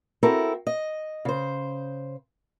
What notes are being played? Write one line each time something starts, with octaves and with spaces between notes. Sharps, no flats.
C4 E4 F#4 A4 A#4
D#5
C#3 C5